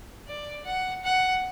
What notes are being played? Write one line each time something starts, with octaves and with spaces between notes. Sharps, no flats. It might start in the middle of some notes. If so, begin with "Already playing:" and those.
D5
F#5
F#5